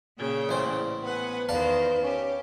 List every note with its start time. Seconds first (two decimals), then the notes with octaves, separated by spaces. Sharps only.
0.18 A#2 C#3 G5
0.49 A1 C5 D5
1.03 B3 B4 F#5 G#5
1.49 E2 D#3 B4 C5 D5 F5 A5
2.03 C#4 G4